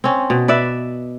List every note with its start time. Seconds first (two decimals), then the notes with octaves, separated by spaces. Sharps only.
0.04 C4 C#4
0.30 B2
0.48 B4 D5 E5